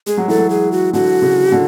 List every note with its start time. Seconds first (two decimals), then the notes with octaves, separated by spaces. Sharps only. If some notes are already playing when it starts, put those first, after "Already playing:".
0.06 G#3 G#4
0.17 F#3
0.28 E3 A4
0.38 F#3
0.50 G#4
0.72 F#4
0.93 D3 F#4
1.22 C#3
1.52 D3